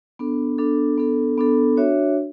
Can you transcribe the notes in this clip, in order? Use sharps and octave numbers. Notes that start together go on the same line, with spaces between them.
B3 D4 A4
B3 D4 A4
B3 D4 A4
B3 D4 A4
D4 F#4 C#5 E5